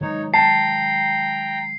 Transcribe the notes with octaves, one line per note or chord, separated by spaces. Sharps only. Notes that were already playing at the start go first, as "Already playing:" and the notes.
D#3 F#3 G#3 D#4 C#5
G5 A5 A#5 C7